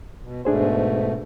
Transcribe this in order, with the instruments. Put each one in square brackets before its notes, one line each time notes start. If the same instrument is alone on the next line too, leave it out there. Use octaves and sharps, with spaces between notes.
[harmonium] B2
[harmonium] G#2 B2 A3 [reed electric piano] D4 G#4 C5